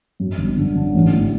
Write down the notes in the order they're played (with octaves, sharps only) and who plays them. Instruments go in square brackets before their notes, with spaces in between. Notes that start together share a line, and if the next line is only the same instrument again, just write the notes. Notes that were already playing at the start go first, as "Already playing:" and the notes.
[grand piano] F#2
G1
D3
D3
A1
A2